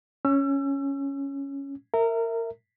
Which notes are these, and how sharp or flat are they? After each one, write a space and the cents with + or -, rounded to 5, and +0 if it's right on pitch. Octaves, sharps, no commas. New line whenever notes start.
C#4 +0 E6 +35
A#4 -20 E5 +0